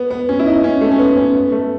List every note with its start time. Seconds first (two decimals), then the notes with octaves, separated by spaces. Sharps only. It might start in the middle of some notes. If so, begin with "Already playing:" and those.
Already playing: B3
0.11 B3
0.29 C#4
0.39 E4
0.46 D#4
0.64 C#4
0.81 A3
0.92 C#4
0.99 B3
1.17 C#4
1.34 B3
1.52 A3